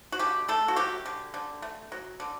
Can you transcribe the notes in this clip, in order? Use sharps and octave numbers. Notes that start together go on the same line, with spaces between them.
F#4
D3 G4
A3 A4
F#4
F#3 G4
D3
D3
A3
F#3
D3